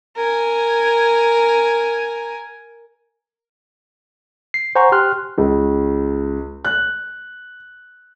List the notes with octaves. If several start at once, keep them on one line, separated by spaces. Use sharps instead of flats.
A#4 G#5
C7
C5 F#5 G#5 A#5 C#6
G4 G5 C6 F6 F#6
C#2
F#6